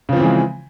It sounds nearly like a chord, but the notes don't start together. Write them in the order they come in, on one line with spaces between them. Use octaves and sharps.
C#3 F3 C4 E3 G#3